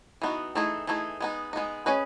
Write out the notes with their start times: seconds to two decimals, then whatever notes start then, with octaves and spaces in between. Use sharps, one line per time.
0.22 E3 B3 D#4 F#4
0.55 E3 A3 D#4 G#4
0.87 E3 A3 D#4 G#4
1.20 G#3 B3 D#4
1.53 G#3 B3 D#4
1.86 C#4 G#4 B4 D#5